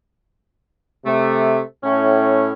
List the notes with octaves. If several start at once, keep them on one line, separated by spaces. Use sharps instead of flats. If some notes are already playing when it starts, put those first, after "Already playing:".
C3 A3
A2 C#4